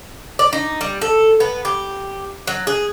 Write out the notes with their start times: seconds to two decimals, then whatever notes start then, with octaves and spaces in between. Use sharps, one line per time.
0.39 D5
0.53 D#4
0.81 G3
1.01 A4
1.40 B3
1.65 G4
2.47 F#3
2.67 G#4